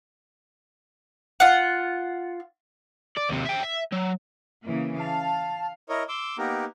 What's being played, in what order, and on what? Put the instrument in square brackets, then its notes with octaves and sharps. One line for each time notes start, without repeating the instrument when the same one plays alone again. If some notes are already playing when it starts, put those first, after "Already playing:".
[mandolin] F4 F#5
[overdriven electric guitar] D5
D#2 C3
E5 G5
E5
F#3
[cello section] C#3 E3 A#3
[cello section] F5 [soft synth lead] A5
[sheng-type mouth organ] E4 A#4 C#5 D#5
C6 D6 E6
A#3 B3 D#4 G4 A#4